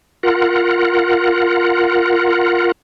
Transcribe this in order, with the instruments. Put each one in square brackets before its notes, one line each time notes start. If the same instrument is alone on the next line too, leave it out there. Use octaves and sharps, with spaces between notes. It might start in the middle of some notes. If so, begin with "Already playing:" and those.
[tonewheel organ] F4 A#4 F#5